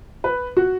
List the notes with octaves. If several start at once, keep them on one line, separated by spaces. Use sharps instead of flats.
B4
F#4